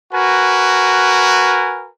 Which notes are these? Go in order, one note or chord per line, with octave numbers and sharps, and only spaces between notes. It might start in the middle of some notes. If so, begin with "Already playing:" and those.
F#4 A#4 B4 G#5